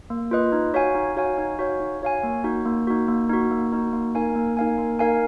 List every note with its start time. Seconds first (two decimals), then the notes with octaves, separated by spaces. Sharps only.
0.10 A#3
0.31 F4 B4 D#5
0.52 D#4
0.74 F#4 C#5 F5 G#5
0.95 D#4
1.17 F#4 C#5 F5 G#5
1.38 D#4
1.59 F#4 C#5 F5 G#5
1.80 D#4
2.02 F#4 C#5 F5 G#5
2.24 A#3
2.44 D#4 F#4
2.66 A#3
2.87 D#4 F#4
3.08 A#3
3.29 D#4 F#4
3.51 A#3
3.72 D#4 F#4
3.93 A#3
4.15 D#4 A#4 F5 G#5
4.35 A#3
4.57 D#4 A#4 F5 G#5
4.78 A#3
4.99 D#4 A#4 F5 G#5